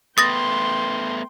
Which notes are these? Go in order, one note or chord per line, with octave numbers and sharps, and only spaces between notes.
A3 B3 B4 G5 C6 D#6 A6 A#6